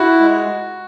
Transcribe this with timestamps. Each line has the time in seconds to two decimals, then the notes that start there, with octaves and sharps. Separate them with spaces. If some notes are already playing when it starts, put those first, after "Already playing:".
Already playing: E4 F#4
0.20 G#3